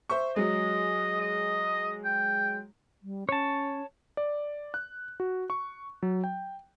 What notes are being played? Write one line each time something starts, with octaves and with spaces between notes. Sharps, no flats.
C5 E5 C#6
F#3 G#3 D#5
D#5
G5
G3
C#4 C#5 A5
D5
F#6
F#4
C#6
F#3
G5